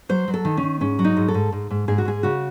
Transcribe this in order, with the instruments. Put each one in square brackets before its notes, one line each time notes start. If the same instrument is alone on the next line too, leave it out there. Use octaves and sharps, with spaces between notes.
[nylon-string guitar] F#3 C5
F#3
A4
D#3
C#4
D#3
G#2 C#4
F#3
D#4
G#2
A4
G#2
G#2
G#2
G#2 G#4
F#4
G#2 G#4
C#3 F#4